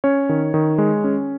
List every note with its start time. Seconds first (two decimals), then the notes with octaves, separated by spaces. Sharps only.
0.04 C#4 C#5
0.29 D#3
0.54 D#3
0.78 G#3
1.04 C#4